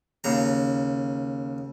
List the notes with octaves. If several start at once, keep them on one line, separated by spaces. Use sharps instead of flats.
D#2 C#3 A#5